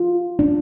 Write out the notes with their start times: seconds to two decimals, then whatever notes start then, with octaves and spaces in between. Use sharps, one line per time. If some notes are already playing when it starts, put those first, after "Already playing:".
Already playing: F4
0.39 D4